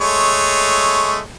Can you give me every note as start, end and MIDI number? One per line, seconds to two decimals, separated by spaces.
0.01 1.19 56
0.01 1.19 57
0.01 1.19 73